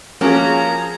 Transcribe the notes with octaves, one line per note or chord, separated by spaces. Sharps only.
F3 A#3 C#4 F#4 G#4 A#5